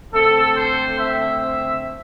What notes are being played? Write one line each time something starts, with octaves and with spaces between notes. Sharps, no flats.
D3 A3 C4 A4
C5
E5